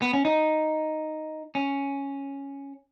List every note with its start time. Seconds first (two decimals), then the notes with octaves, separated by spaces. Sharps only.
0.02 B3
0.13 C#4
0.25 D#4
1.55 C#4